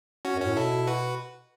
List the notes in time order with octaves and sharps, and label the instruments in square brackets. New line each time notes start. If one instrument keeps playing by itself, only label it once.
[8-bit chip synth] C#4 F#4
[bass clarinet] F#2
[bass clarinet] A2 [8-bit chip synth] C#4 F#4
[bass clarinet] B2 [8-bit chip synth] E4 A4
[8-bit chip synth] F#4 B4